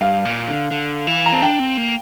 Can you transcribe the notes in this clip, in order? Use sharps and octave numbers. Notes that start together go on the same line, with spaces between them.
G2 F5
A#2
D3
D3
E3
A#5
C4 A5
D4 G5
C4
A#3